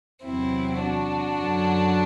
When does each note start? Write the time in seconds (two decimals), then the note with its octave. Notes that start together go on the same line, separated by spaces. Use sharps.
0.24 E2 C3 F#3 C4 E4
0.80 D4 F#4
1.36 F#2 D3 F#3